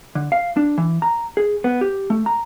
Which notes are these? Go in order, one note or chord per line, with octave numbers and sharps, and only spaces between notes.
D3
F5
D4
E3
A#5
G#4
B3
G4
A3
A#5